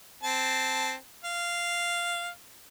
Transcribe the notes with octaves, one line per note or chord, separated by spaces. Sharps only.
C4 A5
F5